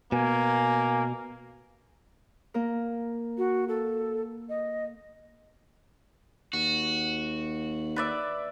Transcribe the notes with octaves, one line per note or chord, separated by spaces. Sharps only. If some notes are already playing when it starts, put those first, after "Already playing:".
B2 A#3 G#5
A#3 A#4
F#4
A4
D#5
D#2 F#4
B4 D5 E5